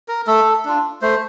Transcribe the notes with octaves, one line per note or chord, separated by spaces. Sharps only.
A#4
A3 A4
D4 F4
A3 C5